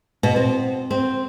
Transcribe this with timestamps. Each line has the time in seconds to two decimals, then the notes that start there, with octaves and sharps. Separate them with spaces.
0.23 B2
0.36 C4
0.91 C4